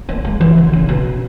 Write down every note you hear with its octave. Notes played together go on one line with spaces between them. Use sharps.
A#3
G#3
E3
D#3
C#3
B2